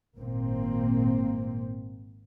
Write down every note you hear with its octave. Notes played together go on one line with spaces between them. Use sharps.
G#1 A#2 A#3 C4